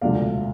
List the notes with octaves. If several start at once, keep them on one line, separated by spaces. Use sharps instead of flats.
E1 D2 C3 F3 D5 F5